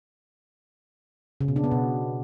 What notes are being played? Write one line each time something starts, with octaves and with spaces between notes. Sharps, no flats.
C#3
B2
D4
B3
B2